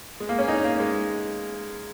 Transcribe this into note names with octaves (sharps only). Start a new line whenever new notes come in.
G#3
A#3
C#4
D#4
A#3
G#3